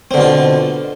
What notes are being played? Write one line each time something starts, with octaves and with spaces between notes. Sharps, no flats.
B2 D3 C4 F4